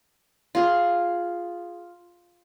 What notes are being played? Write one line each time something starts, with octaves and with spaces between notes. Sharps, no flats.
F4 G#4